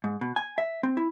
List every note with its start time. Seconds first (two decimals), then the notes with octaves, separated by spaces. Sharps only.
0.04 G#2
0.21 B2
0.36 G#5
0.58 E5
0.83 C4
0.97 E4